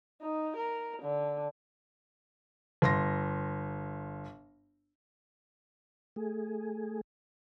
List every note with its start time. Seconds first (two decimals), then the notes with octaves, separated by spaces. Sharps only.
0.21 D#4
0.56 A#4
1.02 D3
2.82 G1 C6 A#6
6.16 A3 G#4